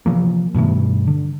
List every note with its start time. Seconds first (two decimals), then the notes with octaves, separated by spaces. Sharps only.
0.06 C3 E3 F3 A#3
0.54 G2 B2 D#3 A3
1.07 D3